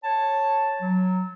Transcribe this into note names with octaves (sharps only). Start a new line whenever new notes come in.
C#5 A5
F#3